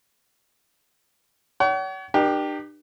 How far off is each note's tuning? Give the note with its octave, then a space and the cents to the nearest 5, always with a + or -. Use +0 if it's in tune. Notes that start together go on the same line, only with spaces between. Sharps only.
C#5 +35 F#5 +45
D4 +45 G4 +0 A#4 +40